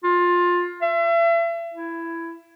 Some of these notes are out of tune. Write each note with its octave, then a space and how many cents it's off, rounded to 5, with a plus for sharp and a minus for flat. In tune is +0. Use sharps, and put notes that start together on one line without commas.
F4 +20
E5 +35
E4 +15